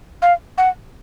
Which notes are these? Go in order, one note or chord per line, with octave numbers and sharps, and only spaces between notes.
F5
F#5